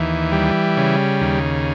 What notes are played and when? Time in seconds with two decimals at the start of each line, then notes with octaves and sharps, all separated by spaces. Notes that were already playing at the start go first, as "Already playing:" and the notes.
Already playing: D#2 E3
0.32 G3
0.77 C#3
1.21 D#2